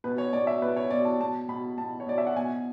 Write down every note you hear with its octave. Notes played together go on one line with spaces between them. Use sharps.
B2 B4
C#5
B2 D5
E5
B2 B4
C#5
B2 D5
A5
B2 A5
B2 B5
B2 A5
C#5
B2 D5
E5
F#5
B2 G#5